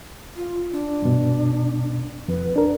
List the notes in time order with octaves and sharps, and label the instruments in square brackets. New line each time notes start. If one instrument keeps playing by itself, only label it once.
[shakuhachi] F4
D4
[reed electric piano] G2 B2
[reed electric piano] F2 [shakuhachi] B4
[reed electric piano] D4 A#4